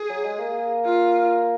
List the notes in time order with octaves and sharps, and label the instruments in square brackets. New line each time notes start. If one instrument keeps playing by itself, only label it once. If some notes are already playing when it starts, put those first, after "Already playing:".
Already playing: [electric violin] G#4
[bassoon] F#3
G#3
A#3
[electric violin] F4